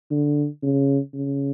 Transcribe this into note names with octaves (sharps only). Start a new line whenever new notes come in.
D3
C#3
C#3